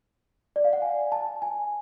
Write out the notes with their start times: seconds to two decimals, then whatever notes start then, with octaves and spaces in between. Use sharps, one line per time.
0.56 D5
0.64 F5
0.73 F#5
0.82 G#5
1.12 A5
1.42 G#5